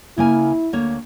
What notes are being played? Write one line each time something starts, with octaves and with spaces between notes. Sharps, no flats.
C#3 A#3 E4 G#5
D2 A#3 C#5